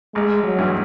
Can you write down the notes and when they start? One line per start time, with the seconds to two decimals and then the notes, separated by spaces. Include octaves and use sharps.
0.15 A1 G#3
0.44 F#3
0.58 G2 E3 G#3